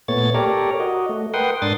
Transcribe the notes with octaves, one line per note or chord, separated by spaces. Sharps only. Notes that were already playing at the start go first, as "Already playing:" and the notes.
A#2 A3 B3 C#5 A6
G4 A4 A#4 C#5 D5 A#5
F#4 D#5
A3
A#4 B4 F#5 G5 C6 D#6
G#2 D4 C6 D#6 A6